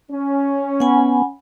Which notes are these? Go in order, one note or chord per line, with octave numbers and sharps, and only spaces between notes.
C#4
B3 F#5 G#5 B5